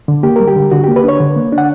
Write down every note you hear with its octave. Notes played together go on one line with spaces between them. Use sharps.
D3
A#3 G4
G3 A#4
G4
D3
D3 F#4
A#3 G4
B4
D4 C#5
D3
A#3
D4
F#5